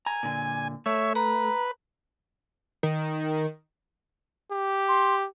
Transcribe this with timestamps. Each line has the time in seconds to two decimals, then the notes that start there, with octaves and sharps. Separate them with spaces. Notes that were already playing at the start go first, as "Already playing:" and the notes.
0.06 G#5 A#5
0.23 A#2 D3
0.86 A3 C#5 E5
1.15 B4 A#5
2.83 D#3
4.51 G4
4.88 C6